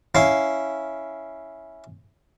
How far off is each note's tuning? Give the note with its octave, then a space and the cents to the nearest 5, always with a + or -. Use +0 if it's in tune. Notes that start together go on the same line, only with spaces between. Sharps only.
C#4 +0 E4 -5 F5 +0